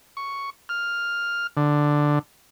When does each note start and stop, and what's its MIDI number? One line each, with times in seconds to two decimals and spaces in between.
0.17 0.50 85
0.69 1.47 89
1.57 2.19 50